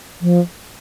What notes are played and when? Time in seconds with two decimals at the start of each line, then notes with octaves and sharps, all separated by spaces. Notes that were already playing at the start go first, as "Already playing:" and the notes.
0.21 F3